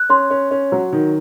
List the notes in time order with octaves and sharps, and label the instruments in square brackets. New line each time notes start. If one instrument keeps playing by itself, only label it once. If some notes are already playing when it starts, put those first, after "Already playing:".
Already playing: [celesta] F#6
[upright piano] C#4 [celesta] C6
[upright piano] C#4
C#4
F#3
D#3